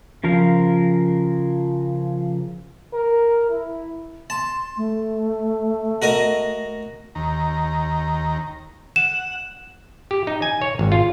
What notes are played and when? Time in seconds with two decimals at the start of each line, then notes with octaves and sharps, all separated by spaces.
0.24 C#3 F3 A#4 F5
2.93 A#4
3.50 E4
4.30 A5 C6
4.77 A3
6.02 F#4 A#4 D#5
7.15 D#2 A#5
8.96 F#5 E7
10.11 G4
10.27 D#4
10.42 G#5
10.62 C#5
10.79 G#1
10.92 F4